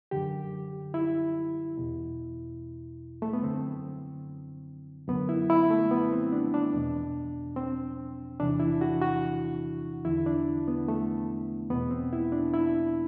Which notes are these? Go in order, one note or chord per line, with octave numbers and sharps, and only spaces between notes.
F#2 D3 G4
E4
E2 B2
A3
B3
F#2 D3 C4
F#2 D3 B3
E4
E4
A3
B3
C4
D4
D4
E2 B2
C4
E2 C3 E3 D4
E4
F#4
F#4
E2 D3 E4
D4
B3
A3
E2 B2 B3
C4
E4
D4
E4